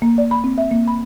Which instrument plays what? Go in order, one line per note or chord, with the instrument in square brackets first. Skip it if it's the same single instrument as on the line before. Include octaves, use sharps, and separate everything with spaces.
[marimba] A#3
D5
B5
C4
E5
A#3
B5